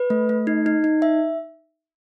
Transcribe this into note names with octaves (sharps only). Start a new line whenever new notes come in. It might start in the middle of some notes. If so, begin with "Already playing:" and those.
Already playing: B4
A3
A3
D#4
D#4
D#4
E5